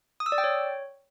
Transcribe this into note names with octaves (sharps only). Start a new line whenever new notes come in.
D#6
E6
D5
G5
C#5